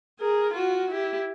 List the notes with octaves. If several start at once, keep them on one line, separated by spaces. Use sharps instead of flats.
G#4 A#4
F4 F#4
E4 G4